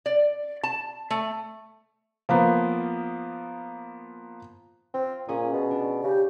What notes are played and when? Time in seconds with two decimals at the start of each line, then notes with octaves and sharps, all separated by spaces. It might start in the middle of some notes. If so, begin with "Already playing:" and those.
0.06 D5
0.63 A5
1.10 A3
2.29 F3 A#3 B3
4.94 C4 F4
5.29 A#2 C#4 G#4 D#6
5.53 B2
5.71 D4
6.04 C#3 G4